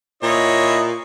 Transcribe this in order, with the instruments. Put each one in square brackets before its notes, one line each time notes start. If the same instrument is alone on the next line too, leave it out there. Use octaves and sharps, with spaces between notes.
[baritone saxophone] A#2 [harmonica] E4 C#5 D#5